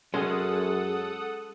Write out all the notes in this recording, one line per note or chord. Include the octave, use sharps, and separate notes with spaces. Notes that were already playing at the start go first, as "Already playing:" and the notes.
F#2 G#3 C#4 G#4 A4 F#5 D#6